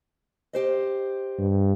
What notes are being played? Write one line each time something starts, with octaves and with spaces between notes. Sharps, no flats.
G4 C5 D#5
G2